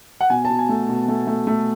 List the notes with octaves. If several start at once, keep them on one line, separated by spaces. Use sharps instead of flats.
F#5
B2 G#5
A5
B2
G#5
A3
B2
A3
A3
A3